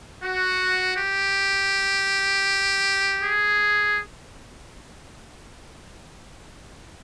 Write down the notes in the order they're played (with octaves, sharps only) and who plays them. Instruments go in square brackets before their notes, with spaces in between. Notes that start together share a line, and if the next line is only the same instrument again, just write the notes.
[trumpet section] F#4
G4
G#4